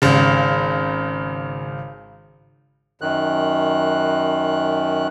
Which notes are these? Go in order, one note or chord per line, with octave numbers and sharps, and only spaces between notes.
G#1 C#3
F#2 D#3 F#6